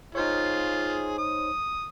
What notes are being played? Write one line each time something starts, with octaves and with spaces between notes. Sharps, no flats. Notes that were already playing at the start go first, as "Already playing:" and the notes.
D#4 F4 G#4 C5 C#5
D#6